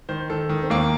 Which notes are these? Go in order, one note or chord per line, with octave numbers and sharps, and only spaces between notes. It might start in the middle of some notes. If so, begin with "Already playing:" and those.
D#3 C5
D#3 A4
D#3
C4
D#2 A#3